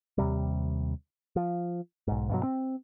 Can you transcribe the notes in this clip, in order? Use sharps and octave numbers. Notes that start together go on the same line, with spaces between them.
D#2 C3 G3
F3
B1 G#2
G2 B2 F#3
C4